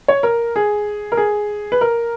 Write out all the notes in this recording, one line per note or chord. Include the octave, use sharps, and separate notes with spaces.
C#5
A#4
G#4
A#4
G#4
B4
A#4